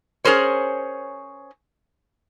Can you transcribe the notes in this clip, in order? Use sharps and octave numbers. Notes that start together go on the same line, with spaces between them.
C#4 G#4 A#4 C5 C#5